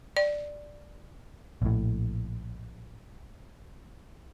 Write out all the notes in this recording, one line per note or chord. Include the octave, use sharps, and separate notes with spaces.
D5
A#1 A2